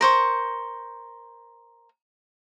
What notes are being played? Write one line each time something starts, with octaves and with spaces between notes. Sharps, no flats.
A#4 C5 C#6